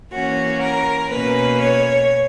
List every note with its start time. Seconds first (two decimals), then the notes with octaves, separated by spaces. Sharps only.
0.12 E3 A#3 C#4 F#4
0.62 A#4
1.11 B2 A#3 C#4 B4
1.61 C#5